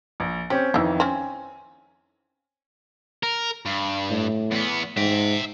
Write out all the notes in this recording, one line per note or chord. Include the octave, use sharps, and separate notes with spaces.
A#1
C4 C#4 G4
F2 D#3 E3 E4 F4
C4 C#4 G#5
A#4
G2
A2
E2 B3
G#2 E5 G5